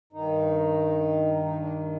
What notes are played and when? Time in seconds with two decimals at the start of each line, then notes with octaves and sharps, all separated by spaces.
0.13 G2 D#3 D#4
1.43 D#4
1.59 D4